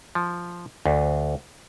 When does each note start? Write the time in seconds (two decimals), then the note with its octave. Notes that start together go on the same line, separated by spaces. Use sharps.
0.15 F3
0.86 D2